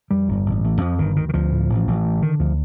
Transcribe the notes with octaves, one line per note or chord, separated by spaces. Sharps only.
F2 G3
G1
A1
A1
F2 F3
G1 D#3
D2 D#3
D#3
D2 F3
A2
A1
A1
A2
D3 D#3
D2 F3